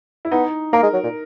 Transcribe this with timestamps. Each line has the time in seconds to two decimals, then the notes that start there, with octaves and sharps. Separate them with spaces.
0.25 E4
0.31 B3 D#4
0.73 A#3 A#4
0.83 G#3
0.93 F#3
1.03 A#2